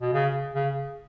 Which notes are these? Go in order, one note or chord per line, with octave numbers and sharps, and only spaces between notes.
B2
C#3
C#3